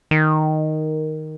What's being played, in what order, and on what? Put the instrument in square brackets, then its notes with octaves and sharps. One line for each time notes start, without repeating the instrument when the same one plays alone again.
[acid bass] D#3